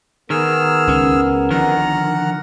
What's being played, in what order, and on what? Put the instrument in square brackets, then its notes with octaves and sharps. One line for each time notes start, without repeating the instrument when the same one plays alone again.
[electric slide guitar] D#3 [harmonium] B3 A#4 [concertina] G#4 E6 F6
[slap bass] C#2 C#4
[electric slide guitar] D3 D#3 [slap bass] F3 [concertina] F#5 A#5 F6